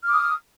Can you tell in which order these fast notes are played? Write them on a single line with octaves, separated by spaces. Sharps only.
F6 D6 D#6